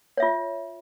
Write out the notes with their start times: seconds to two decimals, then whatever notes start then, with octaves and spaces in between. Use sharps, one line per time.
0.17 C#5
0.20 E5
0.22 F4